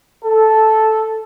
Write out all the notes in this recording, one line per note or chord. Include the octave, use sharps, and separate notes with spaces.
A4